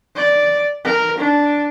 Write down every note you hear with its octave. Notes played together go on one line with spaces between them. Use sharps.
D5
A#4
D4